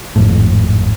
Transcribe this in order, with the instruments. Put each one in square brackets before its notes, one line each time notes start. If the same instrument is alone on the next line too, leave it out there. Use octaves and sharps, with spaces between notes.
[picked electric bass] G#1 F2 A2